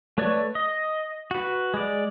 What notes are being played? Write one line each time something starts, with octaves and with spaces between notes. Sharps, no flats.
A3 B4 C#5 D5 C#6
D#5
F#4 B4
G#3 D5